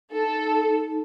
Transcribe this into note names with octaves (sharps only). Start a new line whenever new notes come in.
D#4 A4